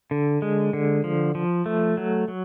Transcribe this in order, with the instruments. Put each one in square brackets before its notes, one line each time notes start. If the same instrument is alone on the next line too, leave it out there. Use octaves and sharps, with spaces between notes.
[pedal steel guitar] D3
G#3
D3
F3
F3
A3
F#3
F#3